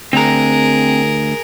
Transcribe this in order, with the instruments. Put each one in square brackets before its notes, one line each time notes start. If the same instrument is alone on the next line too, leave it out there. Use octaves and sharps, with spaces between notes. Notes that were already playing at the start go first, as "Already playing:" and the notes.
[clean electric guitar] D2 [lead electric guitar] C4 A#5 [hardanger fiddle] G#4 A#4